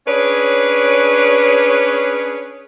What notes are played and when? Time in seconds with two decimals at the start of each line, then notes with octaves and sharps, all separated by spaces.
0.07 C#4 D4 G#4 B4 C#5